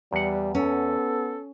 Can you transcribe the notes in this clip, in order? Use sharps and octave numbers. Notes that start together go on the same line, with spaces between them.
E2 G3 F#5
B3 C#4 A4